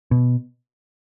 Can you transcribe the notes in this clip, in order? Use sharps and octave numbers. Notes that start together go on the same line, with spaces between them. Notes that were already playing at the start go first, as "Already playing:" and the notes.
B2